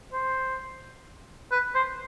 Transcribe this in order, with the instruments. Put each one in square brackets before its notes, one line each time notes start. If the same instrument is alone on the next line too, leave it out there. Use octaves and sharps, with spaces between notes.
[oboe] C5
B4
C5